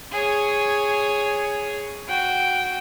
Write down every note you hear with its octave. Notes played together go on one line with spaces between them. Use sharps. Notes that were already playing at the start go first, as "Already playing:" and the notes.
G#4 C#5
F#4 G5